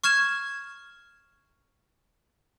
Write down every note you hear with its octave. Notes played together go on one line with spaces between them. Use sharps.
C#6 F6 G#6 E7